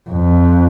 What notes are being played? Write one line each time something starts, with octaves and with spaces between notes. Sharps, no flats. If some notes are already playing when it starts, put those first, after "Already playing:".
F2